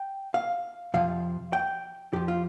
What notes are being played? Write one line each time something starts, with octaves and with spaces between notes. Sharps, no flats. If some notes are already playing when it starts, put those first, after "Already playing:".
Already playing: G5
F5
F2 C3 F3 F5
G5
F2 F3 G4
F4